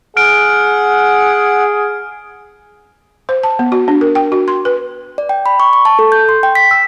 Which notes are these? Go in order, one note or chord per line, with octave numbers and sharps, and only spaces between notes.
G#4 F#5 F6 D7
C5
A5
B3
F#4
D4
A#4
G5
F#4
C6
B4
D5
G5
B5
C#6
C#6
A5
A4
G6
C6
G5
B6
E6